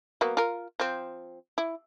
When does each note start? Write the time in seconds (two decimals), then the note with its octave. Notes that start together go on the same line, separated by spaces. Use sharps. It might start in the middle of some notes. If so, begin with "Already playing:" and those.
0.21 F#3 A#3 B3
0.37 F4 A#4
0.80 F3 C4
1.58 E4